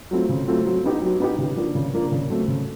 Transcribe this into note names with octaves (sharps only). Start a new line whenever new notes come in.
F#3 A3 C4 F4
C#3
F#3 A3 C4 F4
F#3
B3 D#4 G4
F#3
B3 D#4 G4
C#3
F3 A#3 D4
C#3
F3 A#3 D4
C#3
F#3 A3 C4
C#3